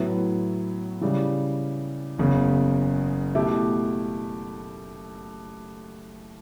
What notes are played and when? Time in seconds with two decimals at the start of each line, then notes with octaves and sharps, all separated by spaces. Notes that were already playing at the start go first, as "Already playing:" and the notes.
Already playing: A2 F#3 B3 E4
1.01 C#3 E3 G3
2.18 F#1 E2 C#3
3.35 B2 A3 E4 G4